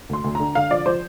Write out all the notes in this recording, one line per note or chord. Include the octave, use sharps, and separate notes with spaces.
D2 C6
D2
D3 A#5
D3 F5
F3 D5
F3 C5